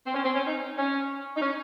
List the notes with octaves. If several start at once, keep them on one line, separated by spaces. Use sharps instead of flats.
C4
C#4
C4
C#4
D#4
C#4
D#4
C#4